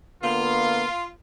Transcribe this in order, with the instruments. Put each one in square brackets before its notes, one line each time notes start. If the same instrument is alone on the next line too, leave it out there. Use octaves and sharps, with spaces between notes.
[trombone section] D3 A#3 B3 [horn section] F4